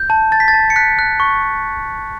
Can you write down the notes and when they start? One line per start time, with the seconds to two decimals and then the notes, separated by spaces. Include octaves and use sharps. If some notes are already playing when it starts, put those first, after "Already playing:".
Already playing: G6
0.10 A5
0.32 A5 A6
0.40 B6
0.48 A6
0.54 A5
0.70 C#7
0.76 F#6 B6
0.99 F#6
1.20 C#6
1.42 C#6